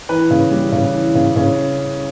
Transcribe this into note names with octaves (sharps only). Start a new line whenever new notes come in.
E3 B4
C#3
G3
C#3
E3
C#3
C#3